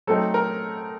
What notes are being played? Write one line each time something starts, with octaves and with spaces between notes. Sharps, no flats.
F#3 A3 C4 D#4 A4
A#4